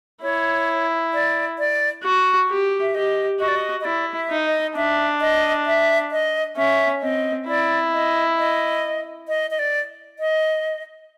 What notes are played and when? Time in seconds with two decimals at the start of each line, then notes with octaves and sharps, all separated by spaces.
0.23 E4 C#5
1.14 D5
1.58 D5
2.04 F#4
2.50 G4
2.81 E5
2.95 G4 D#5
3.39 F#4 D#5
3.48 D5
3.56 D#5
3.81 D#5
3.84 E4 D5
4.15 E5
4.30 D#4
4.46 D#5
4.76 D4 E5
5.21 D#5
5.66 E5
6.11 D#5
6.57 C#4 E5
7.01 C4 D#5
7.47 E4 D5
7.93 D#5
8.38 D#5
9.28 D#5
9.51 D#5
9.59 D5
10.19 D#5